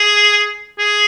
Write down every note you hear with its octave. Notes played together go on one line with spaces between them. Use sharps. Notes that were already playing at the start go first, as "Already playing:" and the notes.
Already playing: G#4
G#4